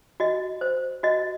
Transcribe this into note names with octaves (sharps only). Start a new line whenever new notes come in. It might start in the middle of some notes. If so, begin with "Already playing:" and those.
F#4 D#5
C5
F#4 D#5